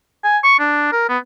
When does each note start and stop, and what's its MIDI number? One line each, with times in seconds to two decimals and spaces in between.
0.24 0.38 80
0.44 0.57 85
0.59 0.88 62
0.92 1.05 70
1.09 1.18 59